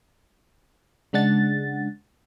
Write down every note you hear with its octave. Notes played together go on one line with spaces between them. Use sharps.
C#3 G#3 D4 F#5 A6